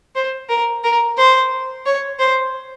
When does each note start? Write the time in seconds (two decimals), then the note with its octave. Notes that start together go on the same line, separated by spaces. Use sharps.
0.15 C5
0.49 A#4
0.84 A#4
1.17 C5
1.86 C#5
2.19 C5